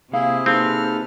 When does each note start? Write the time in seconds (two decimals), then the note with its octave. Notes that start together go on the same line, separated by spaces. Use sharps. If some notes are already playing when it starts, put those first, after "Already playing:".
0.13 C3 A#3 E4 G#4 F5
0.46 A#3 C4 D#4 G#4 A4 B4 F6